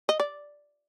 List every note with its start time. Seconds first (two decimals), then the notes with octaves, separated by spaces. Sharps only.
0.09 D#5
0.20 D5